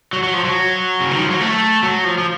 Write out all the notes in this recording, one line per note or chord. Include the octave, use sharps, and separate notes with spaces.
F#3
F#3
F3
F#3
C#3
D#3
F3
F#3
A3
F#3
F3
F3